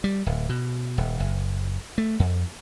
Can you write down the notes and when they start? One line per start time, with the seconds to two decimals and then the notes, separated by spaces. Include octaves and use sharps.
0.04 G3
0.26 D1
0.49 B2
0.98 D#1
1.20 F#1
1.98 A3
2.20 F2